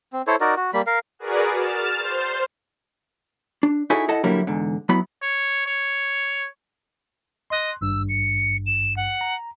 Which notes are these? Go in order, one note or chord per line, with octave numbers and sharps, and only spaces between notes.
C4
E4 A4 C5 C#5
D#4 F#4 A#4 D5
F#4
G3 A#3 B5
A#4 F5
F#4 G#4 A#4 B4 D5
F6 A6 E7
C5
D4
D#4 E4 F#4 G#4 A4 C#5
E4 A4 D#5 F#5 A5
D3 F#3 G3 A#3 D4 E4
E2 G#2 D3
F#3 B3 E4 B5
C#5
C#5
D#5 C6 F#6
G#1 G2 E6
C#7
E7
F#5
A#5